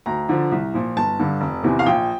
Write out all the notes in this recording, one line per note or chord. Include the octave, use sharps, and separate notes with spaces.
D2 A#5
D3 F3
C2
A#2 F3
G1 A5
G2 D3
F1
E2 C3 E3
F5
A#1 G5